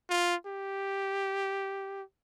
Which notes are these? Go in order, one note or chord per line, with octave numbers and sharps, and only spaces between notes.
F4
G4